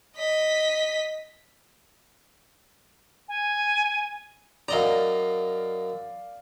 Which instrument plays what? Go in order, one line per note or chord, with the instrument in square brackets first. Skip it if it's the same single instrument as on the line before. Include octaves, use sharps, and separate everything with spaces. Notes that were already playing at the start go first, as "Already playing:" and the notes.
[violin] D#5 B6
[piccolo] G#5
[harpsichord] F#2 D#5 A#5 [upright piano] D5 F5